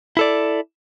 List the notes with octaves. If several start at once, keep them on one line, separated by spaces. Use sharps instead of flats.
E4 A4 D5